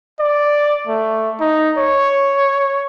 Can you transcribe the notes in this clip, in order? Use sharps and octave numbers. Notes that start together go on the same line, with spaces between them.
D5
A3
D#4
C#5